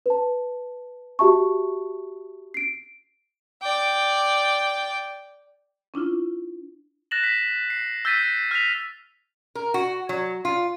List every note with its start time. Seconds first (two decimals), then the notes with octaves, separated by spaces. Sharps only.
0.06 B4 A5
1.19 F#4 G4 E5 A5 C#6
2.54 C7 D7
3.62 D5 G5
5.94 C#4 D4 E4 F4
7.11 F#6 A6 A#6 E7 F#7
7.24 B6 F#7
7.70 C7
8.05 E6 G6 A6 B6 D#7
8.51 F6 G6 A#6 B6 F7
9.55 A#4
9.74 F#4
10.09 F#3
10.45 F4